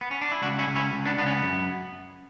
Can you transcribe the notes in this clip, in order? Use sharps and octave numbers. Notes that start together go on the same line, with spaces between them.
B3
C#4
D4
E4
C#2 D4 F#4
C#4 E4
C#2
C#4 E4
C#2
B3 D4
C#2 B3 D4
C#4
B3
F#2